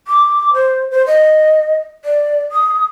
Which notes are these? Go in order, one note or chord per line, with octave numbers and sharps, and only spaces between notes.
D6
C5
C5
D#5
D5
D#6